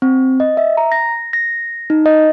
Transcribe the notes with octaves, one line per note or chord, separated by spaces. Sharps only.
C4
D#5
E5
A#5
A#6
A#6
D#4
D#5